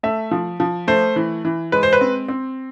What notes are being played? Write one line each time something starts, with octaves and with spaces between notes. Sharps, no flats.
A3 E5
F3
F3
A3 C5
E3
E3
G#3 B4
C5
B4
C4
C4